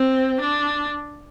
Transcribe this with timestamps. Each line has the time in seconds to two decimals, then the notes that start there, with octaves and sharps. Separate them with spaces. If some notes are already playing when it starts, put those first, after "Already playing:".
Already playing: C4
0.41 D4